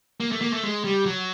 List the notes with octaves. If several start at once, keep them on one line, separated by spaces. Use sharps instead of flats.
A#3
A3
A#3
A3
G#3
G3
F#3